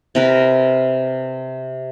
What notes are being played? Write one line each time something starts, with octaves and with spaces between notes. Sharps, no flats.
C3 A#4 B4